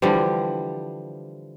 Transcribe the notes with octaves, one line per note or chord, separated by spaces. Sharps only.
D3 E3 F3 G3